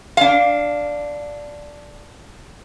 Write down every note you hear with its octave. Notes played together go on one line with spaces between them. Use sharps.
D4 F5